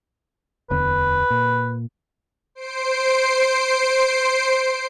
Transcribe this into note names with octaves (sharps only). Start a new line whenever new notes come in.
D1 E2 D3 B4
A#2
C5 C7 D7